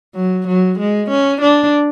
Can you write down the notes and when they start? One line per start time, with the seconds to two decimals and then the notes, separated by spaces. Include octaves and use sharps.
0.15 F#3
0.47 F#3
0.79 G#3
1.10 C#4
1.41 D4